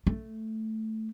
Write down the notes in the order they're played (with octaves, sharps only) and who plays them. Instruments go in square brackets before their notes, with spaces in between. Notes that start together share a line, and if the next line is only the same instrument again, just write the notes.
[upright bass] A3